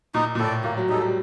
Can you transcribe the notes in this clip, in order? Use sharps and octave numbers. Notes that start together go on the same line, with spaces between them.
A#2 D#4
A#2
A2 A4 D5
A#2 A#3
F#3
G3 D#4 A4
G3